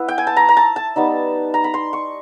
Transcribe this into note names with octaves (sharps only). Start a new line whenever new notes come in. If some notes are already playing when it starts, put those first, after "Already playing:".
Already playing: B3 E4
G5
G#5
A5
A#5
A#5
A5
A5
G3 B3 D#4
A#5
B5
C6
C#6